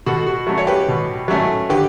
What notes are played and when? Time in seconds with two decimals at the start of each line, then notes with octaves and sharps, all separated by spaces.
0.06 B2 F#4 A4
0.27 F#4
0.47 F#3 A3 C#4
0.58 C#5
0.67 G4 B4
0.88 B2
1.28 F#3 A3 C#4
1.70 D3 G4 B4